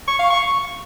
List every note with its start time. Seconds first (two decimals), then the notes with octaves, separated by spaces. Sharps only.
0.08 C#6
0.19 F5
0.30 C#6